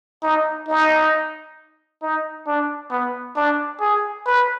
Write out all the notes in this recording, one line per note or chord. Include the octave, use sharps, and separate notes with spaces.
D#4
D#4
D#4
D4
B3
D4
G#4
B4